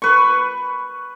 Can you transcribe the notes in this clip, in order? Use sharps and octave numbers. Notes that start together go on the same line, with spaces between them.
B4 C#6